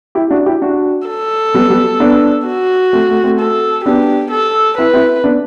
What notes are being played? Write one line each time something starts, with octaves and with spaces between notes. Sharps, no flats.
E4 G4
D4 F#4
E4 G4
D4 F#4
A4
G3 B3
G3 B3
B3 D4
F#4
A3 C4
A3
A3 C4
A4
B3 D4 G4
A4
C4 E4 B4
C4 E4
B3 D4